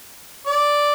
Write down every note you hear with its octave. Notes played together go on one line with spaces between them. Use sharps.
D5